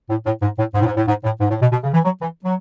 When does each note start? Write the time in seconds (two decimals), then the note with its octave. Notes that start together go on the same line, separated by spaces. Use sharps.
0.10 A2
0.26 A2
0.42 G#2
0.59 A2
0.74 G#2
0.82 A2
0.86 G#2
0.97 A2
1.08 G#2
1.24 A2
1.40 G#2
1.50 A2
1.62 B2
1.72 B2
1.84 C#3
1.94 E3
2.05 F#3
2.22 E3
2.45 F#3